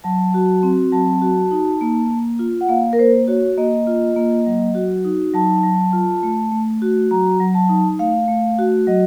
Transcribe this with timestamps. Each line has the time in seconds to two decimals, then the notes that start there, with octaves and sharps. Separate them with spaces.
0.04 F#3 A5
0.34 F#4
0.63 C4
0.92 F#3 A5
1.22 F#4
1.51 D#4
1.81 A#3
2.11 A#3
2.39 F4
2.61 F#5
2.69 A#3 F5
2.93 A#4
2.99 A#3 C5
3.27 F#4 C#5
3.57 A#3 D#5
3.87 F4
4.16 A#3
4.46 F#3
4.75 F#4
5.05 D#4
5.34 F#3 A5
5.63 F#3
5.93 F4
6.23 A3
6.52 A3
6.82 F#4
7.11 F#3 A#5
7.40 F#3
7.54 A5
7.69 D#4
7.99 A3 F5
8.28 A3
8.59 F#4
8.87 F#3 D#5